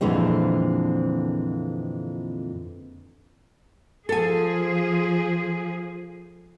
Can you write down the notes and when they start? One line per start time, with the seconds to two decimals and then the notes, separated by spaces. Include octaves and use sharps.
0.01 F2 A#2 D3 E3 G#3 C4
4.09 F3 G#4 A4 G#5